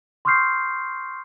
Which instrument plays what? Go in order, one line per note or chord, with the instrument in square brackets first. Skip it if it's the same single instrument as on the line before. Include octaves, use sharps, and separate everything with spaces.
[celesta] C6 C#6 D#6 F6 G6 C7